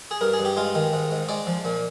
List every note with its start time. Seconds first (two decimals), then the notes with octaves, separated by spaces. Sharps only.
0.11 G#4
0.21 G2 A#4
0.33 G#4
0.39 G2
0.45 G4
0.57 G#3 F4
0.75 D#3
0.93 G#2
1.11 G#2
1.29 G#3 D5
1.47 F3
1.65 A#2